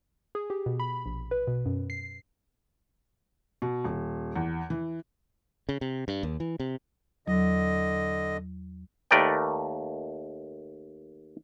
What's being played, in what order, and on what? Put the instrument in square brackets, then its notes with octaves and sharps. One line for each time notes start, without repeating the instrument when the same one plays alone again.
[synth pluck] G#4
G4
B2
B5
A#1
B4
B2
F#2
C7
[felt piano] B2
D#1
E2
E3
[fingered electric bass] C#3
C3
G2
D#2
E3
C3
[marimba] E2 F#3 [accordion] D3 D#5
[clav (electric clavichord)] D#2 A3 A#4 B4 D5 G5